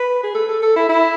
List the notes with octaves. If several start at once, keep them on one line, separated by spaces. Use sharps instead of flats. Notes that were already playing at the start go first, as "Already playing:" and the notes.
Already playing: B4
G#4
A4
A4
A4
E4
E4